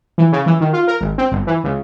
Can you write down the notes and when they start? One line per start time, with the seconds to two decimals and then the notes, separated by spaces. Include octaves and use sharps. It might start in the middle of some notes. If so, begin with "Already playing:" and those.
0.18 E3
0.32 C#3
0.46 E3
0.60 D#3
0.73 F4
0.88 A#4
1.01 G#1
1.18 C4
1.32 G1
1.47 E3
1.64 C#2